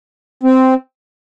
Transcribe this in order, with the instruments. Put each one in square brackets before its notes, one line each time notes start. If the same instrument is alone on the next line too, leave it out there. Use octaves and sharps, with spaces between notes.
[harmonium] C4